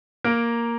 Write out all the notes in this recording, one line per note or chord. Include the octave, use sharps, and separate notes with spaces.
A#3 A#4